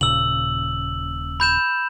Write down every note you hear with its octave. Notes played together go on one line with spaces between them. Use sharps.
D#1 A#2 C#3 E6 F#7
B5 G6 E7